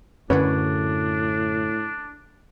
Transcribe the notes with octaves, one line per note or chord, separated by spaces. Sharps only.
F#2 A2 D3 C#4 D4 B4 C#5